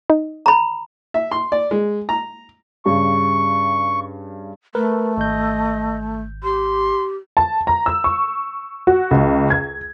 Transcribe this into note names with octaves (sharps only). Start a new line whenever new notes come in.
D#4
A#5 B5
E5
C6
D5
G#3
A#5
G2 C#3 C#6
A3 A#4 B4
G#1 D#5 G6
G4 C6
A5
A#5
E6
C#6
F#4
C#2
G#6